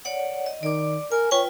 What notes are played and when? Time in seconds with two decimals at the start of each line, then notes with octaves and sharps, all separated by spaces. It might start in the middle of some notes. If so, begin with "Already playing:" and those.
0.05 C#5 D5 F#5
0.46 D#5
0.63 D#3 D5 D6
1.12 A#4 G#5
1.31 F4 B4 C#5 G5